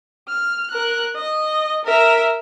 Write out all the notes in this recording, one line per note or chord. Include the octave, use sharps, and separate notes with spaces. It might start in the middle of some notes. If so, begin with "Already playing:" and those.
F6
A#4 F#6
D#5
A#4 E5